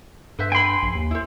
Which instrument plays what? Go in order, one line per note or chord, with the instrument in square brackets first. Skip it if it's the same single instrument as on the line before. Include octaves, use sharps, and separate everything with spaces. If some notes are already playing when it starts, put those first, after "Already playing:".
[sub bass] G2 [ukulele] B4 C5 E5
[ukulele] G5 B5 [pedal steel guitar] G#5 C6
[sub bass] A#1
D#2
[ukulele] E4 C5